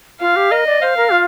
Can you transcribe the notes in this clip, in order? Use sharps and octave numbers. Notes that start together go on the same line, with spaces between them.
F4 F5
G4
A#4 D#5
D5
C5 F5
A#4
F4